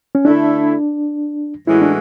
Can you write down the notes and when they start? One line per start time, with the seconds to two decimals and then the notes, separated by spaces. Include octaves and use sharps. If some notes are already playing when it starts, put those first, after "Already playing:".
0.15 C#4
0.25 D3 A3 D4 E4 A4
1.67 A2 E3 G#3 C#4 E4 F#4
1.82 D4